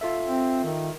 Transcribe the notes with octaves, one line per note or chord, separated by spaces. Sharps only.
F4 A4 E5
C4
D#3